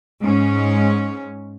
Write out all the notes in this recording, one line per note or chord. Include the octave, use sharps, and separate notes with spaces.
G#2 C#4